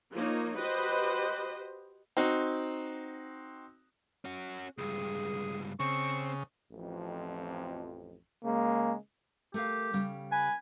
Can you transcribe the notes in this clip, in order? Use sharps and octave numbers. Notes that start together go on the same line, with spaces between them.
F3 A#3 D#4 C#5
F#4 G4 B4 C5 D#5
C4 D#4 F#4
C#4 F#4
C#2 G2 G#4
C#3 C4 C#6
A1 F2
C#3 G#3 A#3
A3 G4 A#4 F5
C#3 G3
B4 G#5